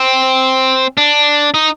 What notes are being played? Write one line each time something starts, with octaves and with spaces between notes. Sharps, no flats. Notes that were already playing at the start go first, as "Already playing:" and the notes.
Already playing: C4
D4
D#4